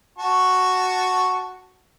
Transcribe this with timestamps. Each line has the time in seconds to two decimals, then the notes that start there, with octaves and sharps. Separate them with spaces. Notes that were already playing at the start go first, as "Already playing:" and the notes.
0.18 F#4 A5 C#6